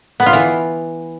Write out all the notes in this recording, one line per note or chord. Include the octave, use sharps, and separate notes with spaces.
B3
F4
E3